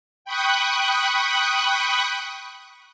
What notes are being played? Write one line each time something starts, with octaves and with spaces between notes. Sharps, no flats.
G5 B5 C#6 D#6 F#6